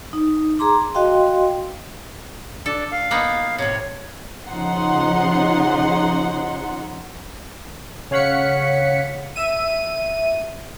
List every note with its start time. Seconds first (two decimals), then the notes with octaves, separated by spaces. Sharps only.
0.13 D#4
0.59 G#4 A#5 C6 D6
0.94 F#4 D#5 F5 G5 C6
2.66 D4 A4
2.91 F5
3.11 A#3 B3 D#4
3.58 A2 C3 C#5
4.48 C#3 F3 D#4 F#5 C6
8.11 C#3 C#5 F5 F#5 B6 C#7
9.36 E5 D#7